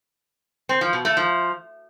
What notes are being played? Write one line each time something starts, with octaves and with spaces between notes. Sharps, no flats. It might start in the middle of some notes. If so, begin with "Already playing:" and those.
C4
F3
B2
A3
F3